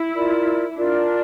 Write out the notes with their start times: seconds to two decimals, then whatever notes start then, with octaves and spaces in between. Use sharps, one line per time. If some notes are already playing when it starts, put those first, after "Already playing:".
Already playing: E4
0.14 F4 A#4 D5
0.78 D4 F4 A#4 D5